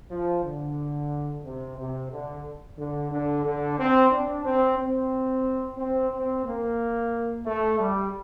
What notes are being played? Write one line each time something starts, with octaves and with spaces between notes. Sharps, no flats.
F3
D3
C3
C3
D3
D3
D3
D3
C4
D4
C4
C4
C4
C4
A#3
A3
G3